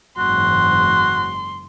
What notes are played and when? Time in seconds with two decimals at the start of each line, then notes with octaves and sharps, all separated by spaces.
0.18 F#1 G#2 E3 F#4 C6